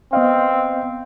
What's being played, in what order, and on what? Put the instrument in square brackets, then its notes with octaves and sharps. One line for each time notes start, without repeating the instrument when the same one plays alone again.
[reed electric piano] B3 D#5 F5 [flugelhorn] C4